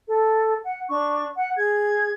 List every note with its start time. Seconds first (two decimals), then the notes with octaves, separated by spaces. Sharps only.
0.07 A4
0.64 F#5
0.88 D4 C#6
1.35 F#5
1.56 G#4 G#6